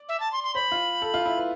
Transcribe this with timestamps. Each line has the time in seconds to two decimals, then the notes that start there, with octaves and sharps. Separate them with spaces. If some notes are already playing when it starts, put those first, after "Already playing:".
Already playing: D5
0.09 E5
0.20 A5
0.32 C6
0.44 C6
0.55 C5 B5
0.72 F4
1.02 A4
1.14 F4
1.26 E4
1.37 B4